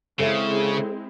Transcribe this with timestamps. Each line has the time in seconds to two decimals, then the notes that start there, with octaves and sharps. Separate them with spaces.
0.19 C#3 G#3 C4 E4 A4 C#5 E5